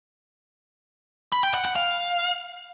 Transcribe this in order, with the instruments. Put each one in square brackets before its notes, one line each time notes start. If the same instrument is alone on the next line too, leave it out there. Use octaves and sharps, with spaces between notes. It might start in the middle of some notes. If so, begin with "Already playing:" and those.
[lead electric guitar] B5
G5
F#5
F#5
F5